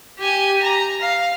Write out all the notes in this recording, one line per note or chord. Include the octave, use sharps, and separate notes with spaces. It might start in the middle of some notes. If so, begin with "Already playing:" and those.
G4 G#5
A#5
F5